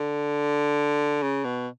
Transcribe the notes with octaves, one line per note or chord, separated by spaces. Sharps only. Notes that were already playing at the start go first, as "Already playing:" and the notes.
Already playing: D3
C#3
B2